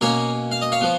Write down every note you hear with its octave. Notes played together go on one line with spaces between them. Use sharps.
B2 A#3 C#4 A#4 C#5
F5
D#5
C#5 F5
F3 B3